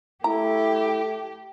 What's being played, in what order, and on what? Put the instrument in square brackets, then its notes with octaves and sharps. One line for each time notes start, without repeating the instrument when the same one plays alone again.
[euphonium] A3 [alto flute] E4 [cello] G4 [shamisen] A#5